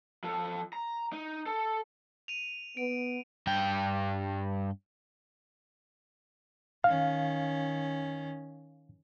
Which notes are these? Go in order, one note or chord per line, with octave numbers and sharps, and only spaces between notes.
F3 A4
A#5
D#4
A4
D#7 F7
B3 D7
G2 G5
D#3 C#4 F5